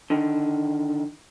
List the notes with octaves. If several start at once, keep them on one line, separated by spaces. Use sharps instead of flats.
D3 D#3